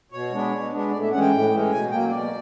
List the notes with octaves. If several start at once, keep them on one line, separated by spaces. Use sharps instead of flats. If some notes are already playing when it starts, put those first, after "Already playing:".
B2 C#5
G#3 B3 D4
B2
G#3 B3 D4
A2 D5
E5
E3 G#3 C#4 F#5
G5
A2
E3 G#3 C#4
B2 G#5
F#3 A#3 G5
B2 D5